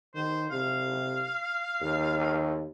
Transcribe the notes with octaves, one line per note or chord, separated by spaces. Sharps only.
D#3 C5
C3 F5
D#2